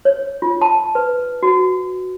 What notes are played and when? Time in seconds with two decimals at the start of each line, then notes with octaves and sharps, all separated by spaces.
0.05 C#5
0.42 F4
0.62 A5
0.95 B4
1.43 F#4